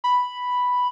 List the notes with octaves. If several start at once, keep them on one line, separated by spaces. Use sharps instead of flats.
B5